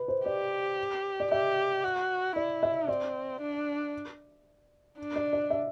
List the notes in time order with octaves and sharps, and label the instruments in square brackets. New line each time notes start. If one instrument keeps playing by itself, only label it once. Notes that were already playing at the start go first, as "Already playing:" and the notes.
Already playing: [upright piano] B4
C5
[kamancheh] G4 [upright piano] D5
[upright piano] D5
[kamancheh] G4 [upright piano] E5
[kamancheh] F#4
[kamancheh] E4 [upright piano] D5
[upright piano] E5
[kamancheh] C4 [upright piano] D5
[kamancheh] D4
D4
[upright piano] D5
D5
E5